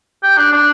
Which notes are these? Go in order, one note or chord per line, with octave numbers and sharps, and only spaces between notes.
G4
D4
D4